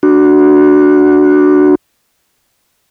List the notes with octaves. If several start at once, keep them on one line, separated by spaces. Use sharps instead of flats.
D4 F#4